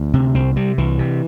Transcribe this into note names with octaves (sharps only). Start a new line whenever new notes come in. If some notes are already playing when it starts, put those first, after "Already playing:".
Already playing: D2
C3
C2 C4
C3 G3
C2 E3
C3